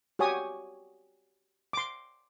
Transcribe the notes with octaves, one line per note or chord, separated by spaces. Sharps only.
F#4 G4 C#5 G#5 D#6
C6 D6